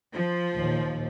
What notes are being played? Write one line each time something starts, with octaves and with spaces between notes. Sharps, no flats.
F3
D#2 A#2